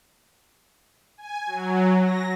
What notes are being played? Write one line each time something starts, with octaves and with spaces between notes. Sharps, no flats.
G#5
F#3
A#6